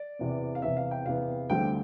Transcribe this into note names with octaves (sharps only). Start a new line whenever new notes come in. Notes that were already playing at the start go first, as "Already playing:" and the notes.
Already playing: D5
E2 C3 E3 B3
F5
E2 C3 E3 B3 E5
F5
G5
E2 C3 E3 B3 F5
D2 D3 G3 C4 G5